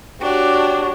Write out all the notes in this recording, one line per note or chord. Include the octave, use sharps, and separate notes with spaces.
D4 F#4 G4 C#5